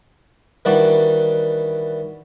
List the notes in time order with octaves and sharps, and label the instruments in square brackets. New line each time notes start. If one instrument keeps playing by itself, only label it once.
[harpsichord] D#3 E3 G3 D4 F#4 D5